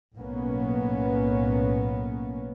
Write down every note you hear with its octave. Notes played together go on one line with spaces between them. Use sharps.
B1 A2 A#3 B3 C#4